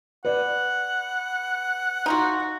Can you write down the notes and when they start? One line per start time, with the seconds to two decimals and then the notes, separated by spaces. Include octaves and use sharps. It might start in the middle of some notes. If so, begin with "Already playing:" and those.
0.25 B4 D5 F#5
2.06 D#4 F4 F#4